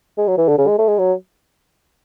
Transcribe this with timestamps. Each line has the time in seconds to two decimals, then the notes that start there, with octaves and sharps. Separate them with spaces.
0.18 G#3
0.28 F#3
0.37 E3
0.48 D3
0.58 C#3
0.67 G#3
0.78 A3
0.88 G#3
0.99 F#3